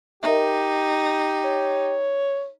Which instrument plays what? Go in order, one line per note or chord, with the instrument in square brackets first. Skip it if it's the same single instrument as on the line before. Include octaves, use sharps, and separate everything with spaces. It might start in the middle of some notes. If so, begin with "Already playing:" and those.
[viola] D#4 [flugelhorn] G4 [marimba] A#4 D#5 E5
[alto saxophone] C#5